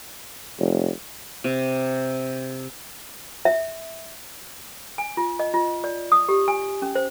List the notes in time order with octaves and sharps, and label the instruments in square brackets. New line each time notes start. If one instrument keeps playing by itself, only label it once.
[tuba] F1
[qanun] C3
[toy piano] E5
G#5
F4
D#5
F4
D5
D#6
G4
G#5
C#4
C5